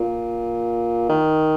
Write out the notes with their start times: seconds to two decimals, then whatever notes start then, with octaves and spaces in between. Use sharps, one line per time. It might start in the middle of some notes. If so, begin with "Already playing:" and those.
Already playing: A#2
1.09 D#3